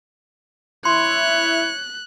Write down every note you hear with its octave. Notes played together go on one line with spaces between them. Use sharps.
E4 C#5 C6 F#6